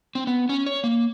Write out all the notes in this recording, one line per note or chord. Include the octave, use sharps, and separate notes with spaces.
C4
B3
C#4
C#5
A#3